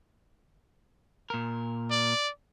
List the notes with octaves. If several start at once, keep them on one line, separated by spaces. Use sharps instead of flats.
A#2 A#4
D5